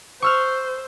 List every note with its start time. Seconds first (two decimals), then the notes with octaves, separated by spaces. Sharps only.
0.22 C5 C#6 E6 F6